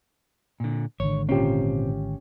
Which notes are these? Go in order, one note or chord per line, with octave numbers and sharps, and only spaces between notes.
A#2 D3
G#1 D3 C#5
A#2 C4 C#4 F4 G4